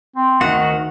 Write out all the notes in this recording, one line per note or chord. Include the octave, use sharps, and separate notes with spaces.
C4
D2 D#3 F#4 F#5